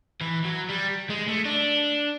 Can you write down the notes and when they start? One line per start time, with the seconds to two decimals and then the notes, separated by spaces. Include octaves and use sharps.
0.21 E3
0.44 F#3
0.69 G3
1.10 G#3
1.28 A3
1.45 D4